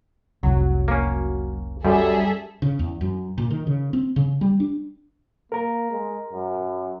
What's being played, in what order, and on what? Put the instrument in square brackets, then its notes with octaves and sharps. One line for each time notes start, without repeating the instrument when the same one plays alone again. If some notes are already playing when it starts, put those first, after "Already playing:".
[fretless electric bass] F1 C2 [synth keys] F#3
[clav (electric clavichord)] A#3 C#4
[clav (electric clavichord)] F#2 [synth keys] G3 [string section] G#4 A4 E5
[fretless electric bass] C#3
E2
F#2
A#2
D#3
C#3
C4
C#3
G3
D4
[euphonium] A#3 [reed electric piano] A#4 A#5
[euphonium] G#3
F#2